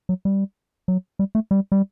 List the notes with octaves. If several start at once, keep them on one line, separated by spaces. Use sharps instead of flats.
F#3
G3
F#3
G3
A3
G3
G3